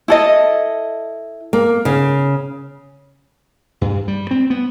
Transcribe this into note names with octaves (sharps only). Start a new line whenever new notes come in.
E4 A4 D#5
A#3
C#3
G2
G3
C4
B3